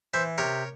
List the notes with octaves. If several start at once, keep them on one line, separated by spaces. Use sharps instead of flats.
E3 C5 E5
C3 A#4 C#5